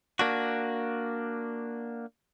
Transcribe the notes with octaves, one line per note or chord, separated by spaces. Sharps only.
A#3 D4 F#4